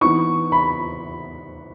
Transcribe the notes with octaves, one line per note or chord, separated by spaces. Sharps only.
E3 B3 D#4 C#6
B5